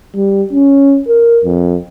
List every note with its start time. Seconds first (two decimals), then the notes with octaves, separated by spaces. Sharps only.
0.16 G3
0.53 C#4
1.08 A#4
1.44 F2